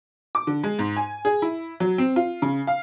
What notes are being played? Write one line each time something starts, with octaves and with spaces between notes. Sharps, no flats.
D6
D3
G#3
G#2
G#5
G#4
E4
F#3
C4
F4
C#3
F5